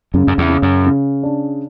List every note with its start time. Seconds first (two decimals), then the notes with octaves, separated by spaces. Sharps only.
0.14 F#2 C#3
0.27 F#2
0.38 E2
0.50 C#3
0.62 F#2
0.86 C#3
1.23 D4